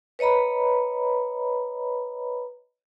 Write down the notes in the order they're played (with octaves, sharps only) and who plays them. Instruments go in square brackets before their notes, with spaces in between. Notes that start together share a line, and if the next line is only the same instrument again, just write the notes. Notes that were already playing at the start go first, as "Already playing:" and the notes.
[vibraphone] B4 C#5 D#5 A#5 B5